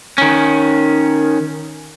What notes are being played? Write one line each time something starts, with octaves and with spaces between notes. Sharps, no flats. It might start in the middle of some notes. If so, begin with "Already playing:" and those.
D#3 C#4